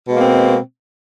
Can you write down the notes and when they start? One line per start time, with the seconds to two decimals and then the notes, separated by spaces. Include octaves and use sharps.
0.07 B2
0.11 G#3
0.15 A#3
0.20 C4